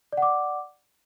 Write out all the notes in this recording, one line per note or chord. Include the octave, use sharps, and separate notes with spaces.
D5 F#5 D6